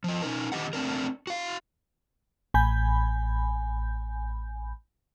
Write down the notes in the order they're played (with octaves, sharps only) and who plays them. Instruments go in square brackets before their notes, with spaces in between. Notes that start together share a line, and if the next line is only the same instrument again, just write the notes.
[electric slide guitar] F3 D#5
C#4 D#4 A#4
D3 D#3 G4 D#5 F#5
A3 C4 D4 A#4
F#4 F5
[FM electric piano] A1 G#5 B5 G6